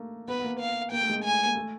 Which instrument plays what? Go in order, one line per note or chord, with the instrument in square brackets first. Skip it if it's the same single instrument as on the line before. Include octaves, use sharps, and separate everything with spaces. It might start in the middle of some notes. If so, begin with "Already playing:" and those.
Already playing: [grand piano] A3 A#3
[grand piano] B3 [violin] B4
[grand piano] B3
A#3
[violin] F5
[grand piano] A#3 [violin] G5
[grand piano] A3
G#3
A3
[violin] G#5
[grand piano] A#3
A3